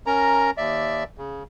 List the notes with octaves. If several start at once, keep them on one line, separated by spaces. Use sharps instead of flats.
C#4 A#4 A#5
D#2 D5 E5
C#3